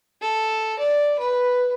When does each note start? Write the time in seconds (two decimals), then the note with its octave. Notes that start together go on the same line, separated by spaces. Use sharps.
0.21 A4
0.79 D5
1.19 B4